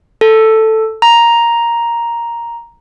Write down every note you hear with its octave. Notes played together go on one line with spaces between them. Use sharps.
A4
A#5